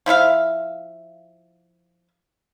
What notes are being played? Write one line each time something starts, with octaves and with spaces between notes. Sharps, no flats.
F3 E4 E5 F5